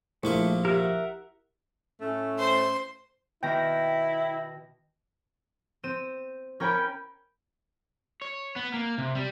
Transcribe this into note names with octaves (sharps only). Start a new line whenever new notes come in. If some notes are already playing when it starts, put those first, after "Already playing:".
A#1 A3 A#3 E4 C#6
G4 A#4 E5 F#5
A2 A3 C#4
C5 C6
B2 D#3 E4 G5 A#6
C4 D#7 E7
C#4 A#4 C#5 G5 A#5 B5
C#5
B3
A#3
C3
G3